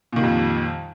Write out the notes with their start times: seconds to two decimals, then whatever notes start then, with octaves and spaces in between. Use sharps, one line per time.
0.13 A#2
0.16 D#3
0.20 G3
0.23 F2